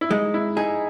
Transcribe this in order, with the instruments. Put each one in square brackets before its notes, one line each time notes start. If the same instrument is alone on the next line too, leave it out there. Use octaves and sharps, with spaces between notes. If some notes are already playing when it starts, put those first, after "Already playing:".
[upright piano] E4
[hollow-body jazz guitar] G#3 [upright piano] D#4
[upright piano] E4
[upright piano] D#4 [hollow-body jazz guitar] G#4